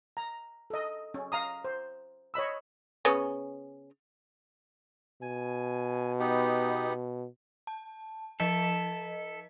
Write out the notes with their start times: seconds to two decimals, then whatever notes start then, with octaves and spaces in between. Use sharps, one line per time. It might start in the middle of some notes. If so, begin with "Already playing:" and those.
0.17 A#5
0.70 A4 D#5
1.14 C#4
1.32 F5 A#5 D#6
1.65 C5
2.34 C#5 D#5 B5 E6
3.05 C#3 B3 C#4
5.22 B2 G#5
6.20 B3 D#4 G4
7.67 A5
8.40 F3 A4 D#5 B6